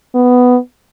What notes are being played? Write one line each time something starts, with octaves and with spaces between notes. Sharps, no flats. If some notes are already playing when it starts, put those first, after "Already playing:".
B3